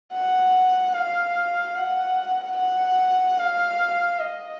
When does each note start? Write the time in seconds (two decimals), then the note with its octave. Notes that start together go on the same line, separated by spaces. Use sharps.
0.13 F#5
0.93 F5
1.76 F#5
2.57 F#5
3.38 F5
4.20 D#5